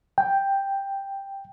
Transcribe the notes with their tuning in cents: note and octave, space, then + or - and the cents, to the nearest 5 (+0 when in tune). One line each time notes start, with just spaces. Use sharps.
G5 +5